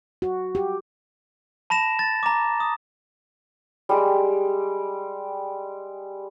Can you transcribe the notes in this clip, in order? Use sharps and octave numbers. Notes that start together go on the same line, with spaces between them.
F#4
G4
A5 B5 A#6 E7
A6
A#5 D6
D#6
G3 G#3 G4